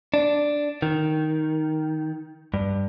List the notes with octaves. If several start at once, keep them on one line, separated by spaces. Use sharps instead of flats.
D4
D#3
G2